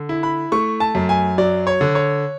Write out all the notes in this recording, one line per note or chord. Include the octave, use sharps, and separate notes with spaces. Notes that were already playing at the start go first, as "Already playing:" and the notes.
Already playing: D3
E4
B5
A3 C#6
A5
F#2
G#5
F#3 D5
C#5
D3
C#5